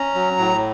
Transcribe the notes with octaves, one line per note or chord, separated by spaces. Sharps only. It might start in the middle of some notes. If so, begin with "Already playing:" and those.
Already playing: C#4 A#5
F#3
A2